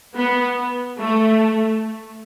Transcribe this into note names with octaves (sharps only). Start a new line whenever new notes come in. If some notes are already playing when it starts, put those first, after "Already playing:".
B3
A3